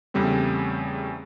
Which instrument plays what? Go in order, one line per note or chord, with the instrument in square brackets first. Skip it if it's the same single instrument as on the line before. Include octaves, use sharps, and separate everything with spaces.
[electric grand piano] E2 C#3 G3 A3 C4